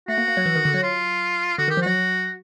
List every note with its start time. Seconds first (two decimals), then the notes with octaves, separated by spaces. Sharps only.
0.08 A3 F#4
0.18 A#3
0.28 A#3
0.37 F#3
0.46 E3
0.55 D#3
0.65 D3
0.74 F#3
0.83 F4
1.58 D3 F#4
1.68 D#3 G4
1.77 F3
1.82 F#3 F#4